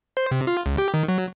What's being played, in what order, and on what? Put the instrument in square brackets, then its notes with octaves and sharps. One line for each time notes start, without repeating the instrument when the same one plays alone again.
[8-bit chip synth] C5
C3
F4
C#2
G4
D#3
F#3